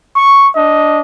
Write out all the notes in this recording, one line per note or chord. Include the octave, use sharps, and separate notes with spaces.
C#6
D4 D#5